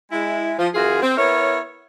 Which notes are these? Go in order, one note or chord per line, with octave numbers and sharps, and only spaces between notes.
G#3 E4
F3
F#2 E3 F4 F#4 G#4
C4
B3 E4 A#4 C#5